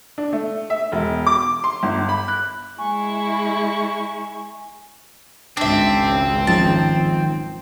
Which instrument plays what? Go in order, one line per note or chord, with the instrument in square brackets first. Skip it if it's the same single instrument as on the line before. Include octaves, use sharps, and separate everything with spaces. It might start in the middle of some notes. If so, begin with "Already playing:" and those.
[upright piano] D4
A3
E5
E1
D6
C6
G1
B5
F#6
[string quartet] G#3 E4 [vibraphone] G#5 [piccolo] C#6
[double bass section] G#1 C#2 C#3 [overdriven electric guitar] C4 [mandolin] D4 E5
[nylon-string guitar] D#3 F3 [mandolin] A5